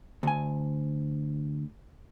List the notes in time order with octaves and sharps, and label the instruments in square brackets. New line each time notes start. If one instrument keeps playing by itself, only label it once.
[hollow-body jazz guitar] D2 G#5